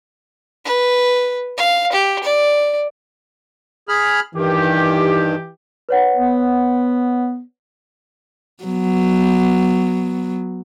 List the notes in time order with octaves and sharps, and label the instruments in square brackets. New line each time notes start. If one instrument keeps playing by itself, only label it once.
[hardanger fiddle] B4
F5
G4
D5
[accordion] G#4 B5 F6
[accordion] G2 D#3 [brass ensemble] E3 G4
[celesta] B4 C#5 F#5
[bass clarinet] B3
[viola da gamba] F#3 B3